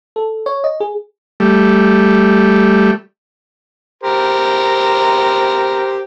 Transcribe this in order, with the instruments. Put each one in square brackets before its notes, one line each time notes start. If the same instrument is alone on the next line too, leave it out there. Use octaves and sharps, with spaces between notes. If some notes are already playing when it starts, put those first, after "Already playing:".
[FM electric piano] A4
C#5
D#5
G#4
[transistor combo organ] G3 A3
[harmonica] G4 A#4 C5